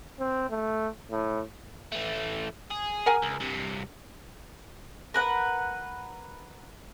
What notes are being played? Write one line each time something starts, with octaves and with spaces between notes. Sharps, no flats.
C4
A3
A2
E3 A3
G#4
A#4 F#5 G#5
C#2
G2 C3
A#4 B4 F#5